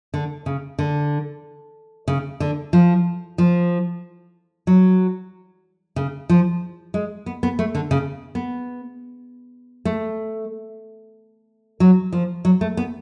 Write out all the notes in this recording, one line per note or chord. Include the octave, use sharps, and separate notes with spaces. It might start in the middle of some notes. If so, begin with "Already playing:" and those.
D3
C#3
D3
C#3
D3
F3
F3
F#3
C#3
F3
G#3
B3
B3
A3
D3
C#3
B3
A3
F#3
F3
F#3
A3
B3